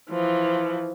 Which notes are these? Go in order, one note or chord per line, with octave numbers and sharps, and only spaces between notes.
E3 F3